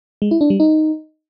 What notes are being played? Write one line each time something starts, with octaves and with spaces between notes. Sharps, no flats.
G#3
E4
D4
G3
D#4